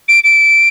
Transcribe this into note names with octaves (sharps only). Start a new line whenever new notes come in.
D7
D7